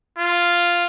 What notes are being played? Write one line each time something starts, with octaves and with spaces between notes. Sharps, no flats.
F4